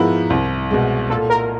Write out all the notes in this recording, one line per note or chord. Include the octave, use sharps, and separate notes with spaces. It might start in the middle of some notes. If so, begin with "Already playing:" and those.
Already playing: G#2 F3 G#3 B3 E4 A#4
C2
B2 G#3
A#2 A4
A#4